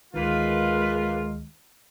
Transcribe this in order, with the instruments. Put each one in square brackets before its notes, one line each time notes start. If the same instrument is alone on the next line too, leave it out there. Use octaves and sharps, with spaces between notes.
[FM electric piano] D2 D#3 [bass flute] G#3 [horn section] A#3 F4 [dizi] B4